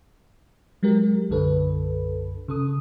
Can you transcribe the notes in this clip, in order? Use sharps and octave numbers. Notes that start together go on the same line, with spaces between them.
F#3 G#3 G4 A#4
B1 F#2 D3 A4 B4
C#3 A4 D#6